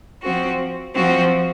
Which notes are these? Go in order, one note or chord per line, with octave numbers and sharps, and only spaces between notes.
F3 C4 F#4
F3 C4 F#4